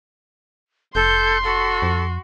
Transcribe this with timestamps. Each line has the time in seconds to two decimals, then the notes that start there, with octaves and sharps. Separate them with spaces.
0.95 F1 A4 C6 G6
1.44 F#4 A4
1.82 F2